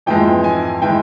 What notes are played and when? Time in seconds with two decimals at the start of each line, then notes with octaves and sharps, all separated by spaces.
0.06 F2 E3 G#3 G5
0.44 G#5
0.82 E3 G#3 G5